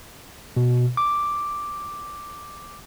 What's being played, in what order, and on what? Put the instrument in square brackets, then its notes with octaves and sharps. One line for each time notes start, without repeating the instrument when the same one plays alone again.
[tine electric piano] B2
D6